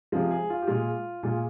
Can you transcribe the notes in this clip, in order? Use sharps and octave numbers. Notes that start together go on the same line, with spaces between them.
C3 F3 G#3 F4
G#4
F4
G4
A#2 G#3 F4
A#2 G#3 F4